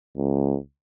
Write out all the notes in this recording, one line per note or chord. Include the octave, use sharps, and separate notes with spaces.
C#2